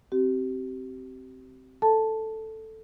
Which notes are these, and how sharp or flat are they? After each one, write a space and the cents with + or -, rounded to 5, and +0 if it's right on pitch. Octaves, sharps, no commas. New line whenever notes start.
C4 +0 G4 -35
A4 +0 A5 +0